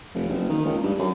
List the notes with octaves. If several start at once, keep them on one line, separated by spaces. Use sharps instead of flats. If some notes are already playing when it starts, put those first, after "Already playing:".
F1
F#1
D#3
C#2
G2
F#2